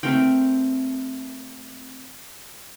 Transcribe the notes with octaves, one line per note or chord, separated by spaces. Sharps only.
A3 C4 A#4 G5